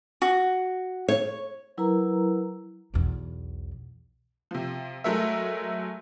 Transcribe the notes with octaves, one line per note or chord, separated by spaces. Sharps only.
F#4
C#5
F#3 E4 A#4 B4 A#5
B1 E2
C3 F3
F#3 G#3 A3 A#4 E5